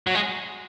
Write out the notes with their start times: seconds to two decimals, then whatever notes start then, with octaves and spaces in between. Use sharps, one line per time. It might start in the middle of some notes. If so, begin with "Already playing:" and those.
0.07 F#3
0.15 G#3